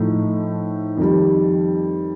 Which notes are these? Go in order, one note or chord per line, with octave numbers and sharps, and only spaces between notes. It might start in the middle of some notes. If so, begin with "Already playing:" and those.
Already playing: A2 F3 A3 D#4
F2 D#3 G3